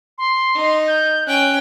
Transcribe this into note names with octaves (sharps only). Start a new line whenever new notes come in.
C6
D#4
G6
C#4 G5 F#6